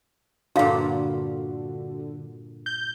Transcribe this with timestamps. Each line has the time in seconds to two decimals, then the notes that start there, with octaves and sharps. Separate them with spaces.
0.56 G2 A#2 D3 F#4 F5 C6
2.66 G6